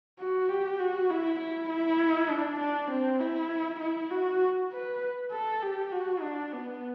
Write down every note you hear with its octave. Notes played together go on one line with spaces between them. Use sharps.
F#4
G4
F#4
E4
E4
E4
D4
D4
C4
E4
E4
F#4
B4
A4
G4
F#4
D4
B3